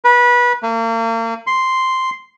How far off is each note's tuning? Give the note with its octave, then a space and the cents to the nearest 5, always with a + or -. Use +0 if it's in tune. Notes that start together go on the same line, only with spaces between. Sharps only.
B4 -25
A#3 -40
C6 -5